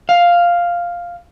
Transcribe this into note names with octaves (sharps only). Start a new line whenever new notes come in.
F5